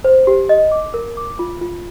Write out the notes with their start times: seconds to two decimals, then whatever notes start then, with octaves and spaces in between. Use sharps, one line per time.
0.04 C5
0.27 G4
0.49 D#5
0.72 D6
0.94 A#4
1.17 D6
1.39 F4
1.61 F4